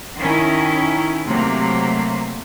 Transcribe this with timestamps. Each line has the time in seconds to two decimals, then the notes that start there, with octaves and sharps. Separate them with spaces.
0.17 D#3 C#4 E4
1.28 C3 F#3 A3 A#3